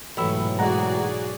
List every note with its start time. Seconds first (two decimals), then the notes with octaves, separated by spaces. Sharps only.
0.17 A1 G#2 B2 E3 F#3 B5 E6
0.59 G#3 F#4 G#4 D5 F#5 A#5